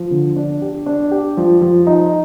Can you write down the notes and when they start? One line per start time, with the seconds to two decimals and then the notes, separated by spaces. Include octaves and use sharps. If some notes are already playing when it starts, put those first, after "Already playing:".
Already playing: F3
0.11 D3
0.36 D4
0.62 G4
0.86 D4
1.11 G4
1.37 F3
1.62 F3
1.87 D#4